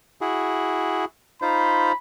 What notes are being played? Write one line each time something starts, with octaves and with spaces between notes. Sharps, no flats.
E4 F#4 G#4
D#4 F4 C5 B5